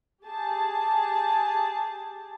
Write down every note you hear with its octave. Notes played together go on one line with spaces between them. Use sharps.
G4 G#4 A5